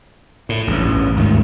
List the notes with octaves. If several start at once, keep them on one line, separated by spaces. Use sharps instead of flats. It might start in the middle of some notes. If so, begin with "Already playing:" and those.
A2
A1 E2 G2
D#2 G#2 D#3 A3